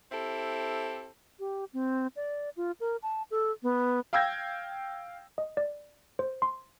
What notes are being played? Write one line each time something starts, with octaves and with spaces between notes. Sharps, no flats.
C4 E4 G4 A4
G4
C4
D5
F4
A#4
A5
A4
B3
F5 G5 E6 G6 G#6 A#6
D#5
D5
C5
C6